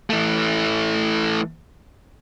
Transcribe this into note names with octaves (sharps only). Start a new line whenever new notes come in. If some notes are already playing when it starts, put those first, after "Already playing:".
E3 A3